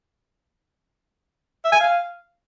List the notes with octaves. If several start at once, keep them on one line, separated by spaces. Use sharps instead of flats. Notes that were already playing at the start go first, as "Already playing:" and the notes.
E5
G#5
F5